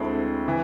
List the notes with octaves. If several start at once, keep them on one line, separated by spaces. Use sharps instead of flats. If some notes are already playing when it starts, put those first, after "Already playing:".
Already playing: D2 D3 G#3 C4 E4
E3